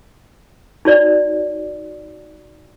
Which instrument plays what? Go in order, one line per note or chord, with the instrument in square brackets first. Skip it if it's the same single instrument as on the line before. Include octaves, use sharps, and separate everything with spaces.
[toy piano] D#4 F#4 C#5 D5